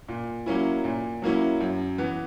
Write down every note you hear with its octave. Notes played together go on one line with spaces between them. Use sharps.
A#2
F#3 A#3 C#4 E4
A#2
F#3 A#3 C#4 E4
F#2
E3 B3